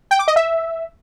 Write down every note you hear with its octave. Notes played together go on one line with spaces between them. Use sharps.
G5
D6
D#5
E5